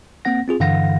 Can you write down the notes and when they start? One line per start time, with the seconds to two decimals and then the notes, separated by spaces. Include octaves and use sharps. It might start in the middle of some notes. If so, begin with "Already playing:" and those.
0.25 A#3 C4 F#5 A#6
0.48 C4 F4 G#4
0.60 G2 D3 E3 F5 F#5 A#6